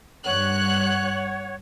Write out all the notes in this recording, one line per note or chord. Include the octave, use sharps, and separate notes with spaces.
G2 C#5 F#5 F#6